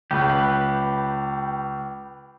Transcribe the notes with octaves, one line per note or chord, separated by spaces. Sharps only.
C#2 G4 B4